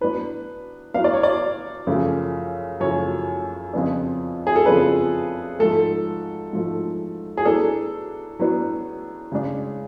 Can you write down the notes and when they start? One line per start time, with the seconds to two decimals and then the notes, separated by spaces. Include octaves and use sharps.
0.01 A2 F#3 B3 D4 B4
0.94 A2 F#3 B3 D4 F5
1.04 D5
1.14 C#5
1.23 D5
1.87 F#2 C#3 F3 A3
2.80 F#2 C#3 F3 A3 C#5
3.73 F2 C#3 F3 B3 D4
4.47 G#4
4.56 A4
4.66 F2 C#3 F3 B3 D4 B4
5.59 G#2 F3 A3 A4
6.53 G#2 F3 A3
7.37 G#4
7.45 A2 F#3 B3 D4 A4
8.39 A2 F#3 B3 D4
9.32 C#3 G#3 D4